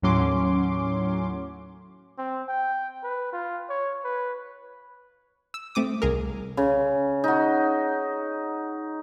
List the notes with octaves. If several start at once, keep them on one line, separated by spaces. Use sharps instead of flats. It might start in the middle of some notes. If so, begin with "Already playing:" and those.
D#2 A2 F#3 C#4 C6 D6
C4
G5
B4
F4
C#5
B4
E6
A3 C4 D6 D#6
C2 G#4 A#4
C#3
D#4 F#4